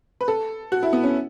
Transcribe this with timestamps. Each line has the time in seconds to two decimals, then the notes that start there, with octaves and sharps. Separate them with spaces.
0.21 B4
0.28 A4
0.72 F#4
0.83 E4
0.93 B3
1.03 C#4